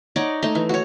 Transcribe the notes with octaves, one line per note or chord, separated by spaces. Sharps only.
D#4 C#5 D5 F#5
A3 D#4 C5
E3
F#4 C#5